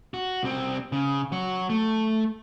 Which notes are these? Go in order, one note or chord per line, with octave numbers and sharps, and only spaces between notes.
F#4
C2 C4
C#3
F#3 C#5
A3